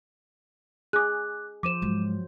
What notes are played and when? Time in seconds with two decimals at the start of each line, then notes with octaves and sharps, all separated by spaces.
0.93 G#4 D6 F#6
1.63 F3 C5 D6 D#7 E7
1.82 G#2 F#3